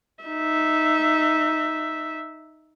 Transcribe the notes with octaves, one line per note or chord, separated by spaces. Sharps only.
D#4 E5